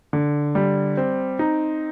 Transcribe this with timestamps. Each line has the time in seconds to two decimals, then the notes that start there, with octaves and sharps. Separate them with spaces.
0.13 D3
0.55 G3
0.97 C4
1.39 D#4